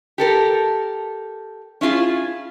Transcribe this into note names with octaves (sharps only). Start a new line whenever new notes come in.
G4 A4 A#4
C#4 E4 F4 G#4